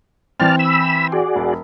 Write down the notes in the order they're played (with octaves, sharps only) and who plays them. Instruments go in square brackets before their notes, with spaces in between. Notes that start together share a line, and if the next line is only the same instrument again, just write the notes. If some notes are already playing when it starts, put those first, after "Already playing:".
[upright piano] E3 C4 [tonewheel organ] D5 A5 F6
[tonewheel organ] B5 E6
F#4 G#4 D5
[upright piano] E1